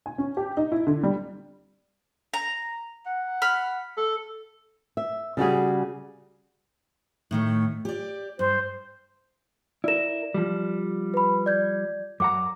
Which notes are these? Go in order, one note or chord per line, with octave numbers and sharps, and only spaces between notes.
G#5
C#4
G4
D#4
E4
D3
G3
A#5
F#5
B5 F6
A4
E5
C#3 G3 F#4 G#4
A2 D#3 A3
G4 D5
G2 C5
E4 A#4 D5 E7
F3 G3
B4 B5
D5 G6 G#6
F#2 F#5 A#5 D6